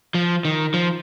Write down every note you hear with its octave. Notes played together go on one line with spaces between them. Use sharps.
F3
D#3
F3